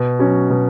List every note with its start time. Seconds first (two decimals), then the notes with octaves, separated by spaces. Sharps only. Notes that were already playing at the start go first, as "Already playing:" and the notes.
Already playing: B2
0.19 F#3 C#4
0.50 B2